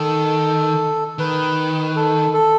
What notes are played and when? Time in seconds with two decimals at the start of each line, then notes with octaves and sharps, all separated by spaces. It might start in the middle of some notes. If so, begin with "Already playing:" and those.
Already playing: D#3 A4
1.18 D#3 B4
1.96 A4
2.34 A4